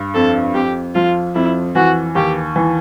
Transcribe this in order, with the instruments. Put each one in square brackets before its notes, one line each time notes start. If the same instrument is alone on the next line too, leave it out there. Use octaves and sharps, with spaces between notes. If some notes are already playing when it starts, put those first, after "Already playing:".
Already playing: [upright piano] G2
[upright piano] F2 [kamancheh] A4
[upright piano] F2 [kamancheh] G4
[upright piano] F3 [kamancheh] F4
[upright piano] F2 [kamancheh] E4
[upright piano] E3 [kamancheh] F#4
[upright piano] D#2 [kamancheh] G4
[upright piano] E3